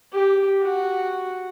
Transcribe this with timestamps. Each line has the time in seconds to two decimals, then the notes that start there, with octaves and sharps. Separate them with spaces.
0.12 G4
0.62 F#4